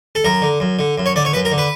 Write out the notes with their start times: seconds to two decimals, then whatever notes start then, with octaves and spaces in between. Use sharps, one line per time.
0.15 A4
0.24 F#2 A#4
0.42 D3
0.60 F#2
0.79 D3
0.98 F#2
1.06 C#5
1.16 D3 D5
1.25 C#5
1.33 F#2 B4
1.45 A#4
1.52 D3
1.58 B4